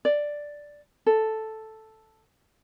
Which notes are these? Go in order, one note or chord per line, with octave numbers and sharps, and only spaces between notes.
D5
A4